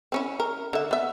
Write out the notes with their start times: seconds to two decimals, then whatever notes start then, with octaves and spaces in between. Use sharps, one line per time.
0.12 C4 C#4 E4
0.40 A#4
0.73 D3 E5
0.91 B3 E5